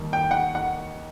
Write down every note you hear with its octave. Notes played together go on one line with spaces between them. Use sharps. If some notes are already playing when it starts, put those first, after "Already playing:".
Already playing: D#2 D#3 G3 D#4
G5
F#5
F#5